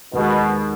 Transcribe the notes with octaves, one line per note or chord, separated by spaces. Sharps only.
D#2 B2 D#3 G#3